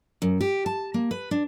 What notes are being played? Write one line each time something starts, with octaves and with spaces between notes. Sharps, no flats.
F#2
G4
A5
A#3
B4
D4